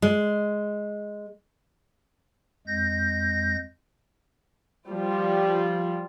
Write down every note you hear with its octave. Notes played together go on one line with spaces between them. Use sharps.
G#3
F2 G#3 G6 A#6
F3 G3 F4